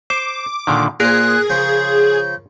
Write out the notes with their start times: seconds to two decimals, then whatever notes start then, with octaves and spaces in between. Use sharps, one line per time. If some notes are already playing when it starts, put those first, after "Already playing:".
0.10 C5 D6
0.67 A#2 D3 D#3
1.00 A#2 G#4 A#4 C5 F#6
1.50 C#3 F3 G6